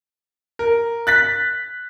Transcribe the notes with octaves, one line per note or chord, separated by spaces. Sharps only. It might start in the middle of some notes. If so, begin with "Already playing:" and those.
A#4
F#6 A6 B6